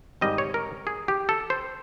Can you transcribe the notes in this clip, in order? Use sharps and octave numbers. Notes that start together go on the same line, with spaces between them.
G#2 D#3 G3 C4 D#5
C#5
A#4
G#4
G4
A4
C5